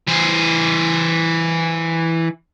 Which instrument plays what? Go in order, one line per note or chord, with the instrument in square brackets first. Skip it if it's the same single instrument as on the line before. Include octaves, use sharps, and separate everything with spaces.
[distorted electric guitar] E3 C5